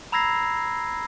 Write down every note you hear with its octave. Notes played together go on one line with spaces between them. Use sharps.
A#5 B5 E6 G#6 A#6 C7